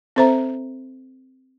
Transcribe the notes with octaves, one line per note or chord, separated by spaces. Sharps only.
C4 A4 C5 E5 A#5